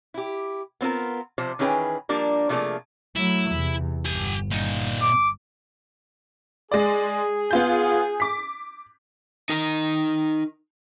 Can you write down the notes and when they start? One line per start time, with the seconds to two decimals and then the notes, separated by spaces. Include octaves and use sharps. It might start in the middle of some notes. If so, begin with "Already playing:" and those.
0.14 E4 G4
0.81 B3 C4 F4 A#4
1.38 C3 F3 C5
1.59 D#3 E3 C#4 G#4 B4 G5
2.09 F3 G3 A#3 D4 A#4
2.49 C3 F3 A3 A#3 G#4 D5
3.16 F#3 A3 E4
3.51 E2 C3
4.05 G1 G4 G#5
4.51 A#2 D#4
5.02 D6
6.72 G#3 G#4 D5
7.51 B3 F4 G6
8.20 D6 B6
9.49 D#4 A#4